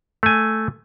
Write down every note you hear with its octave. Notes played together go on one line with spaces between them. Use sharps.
A3 G#5